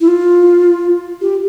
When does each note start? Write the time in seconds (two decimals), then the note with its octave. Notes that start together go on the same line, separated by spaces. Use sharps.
0.01 E4
0.08 F4
1.21 G4